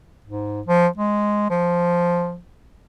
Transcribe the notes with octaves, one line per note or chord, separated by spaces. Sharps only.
G#2
F3
G#3
F3